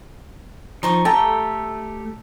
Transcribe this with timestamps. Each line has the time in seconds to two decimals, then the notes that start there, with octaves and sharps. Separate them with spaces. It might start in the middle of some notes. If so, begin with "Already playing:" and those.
0.83 F3 D#4 C5 C#6
1.05 A3 G4 A4 G5 A#5